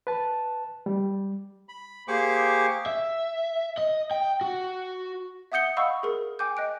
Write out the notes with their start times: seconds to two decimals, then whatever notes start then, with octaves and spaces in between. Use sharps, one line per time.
0.07 B4 A5
0.86 G3
1.69 B5
2.08 A#3 G4 G#4 C5 C#6 D6
2.86 E5
3.78 D#5
4.11 G5
4.41 F#4
5.52 E5 F#5 D#6 G6 C#7 G7
5.77 D#5 F5 F#5 B5 C#6 E6
6.03 G#4 A#4
6.39 G5 G#5 D6 G6
6.57 D#5 F#6 D7